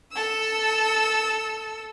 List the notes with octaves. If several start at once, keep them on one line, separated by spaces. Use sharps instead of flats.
A4 E6